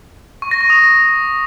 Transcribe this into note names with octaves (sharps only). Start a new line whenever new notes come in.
C#6
A#6
C#6
D#6